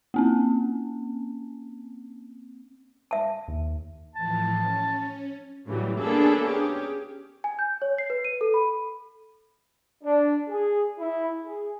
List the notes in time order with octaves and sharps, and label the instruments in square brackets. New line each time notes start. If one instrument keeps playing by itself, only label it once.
[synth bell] A#3 C4 C#4
[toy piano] E5 A5
[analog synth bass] D#2
[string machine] A2 E3 F3 [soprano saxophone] A5
[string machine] C#4
[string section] A2 C#3 E3 F#3 G3
A#3 B3 C#4 D4 G#4 A4
C#4 G4 G#4
[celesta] G#5
G6
C#5
C7
B4
D#7
A4
B5
[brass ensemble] D4
G#4
E4
G#4